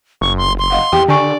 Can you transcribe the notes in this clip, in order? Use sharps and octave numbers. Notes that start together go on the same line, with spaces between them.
F#1 C#6
C6
C6
D#5 F5 F#5
E2 G4 G5
D3 D4 D5 G#5 C#6